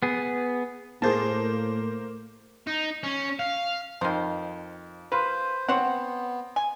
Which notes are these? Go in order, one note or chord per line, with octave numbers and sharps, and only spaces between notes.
B3 G#4
A2 A#3 G#4 C5 A5
D#4
C#4
F5
F2 D#3 C5
A#3 F4 B4 C5
B3 C4 C5 C#5 F#5
G#5